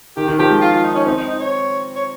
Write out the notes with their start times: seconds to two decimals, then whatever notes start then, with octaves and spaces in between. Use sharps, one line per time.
0.17 D#3 G4
0.28 D#3
0.39 F3 G4
0.50 G#3
0.61 F4
0.73 F4
0.84 D#4
0.95 C#4
1.06 C4 D#4
1.17 D#4
1.29 D#4
1.40 C#5
1.96 C#5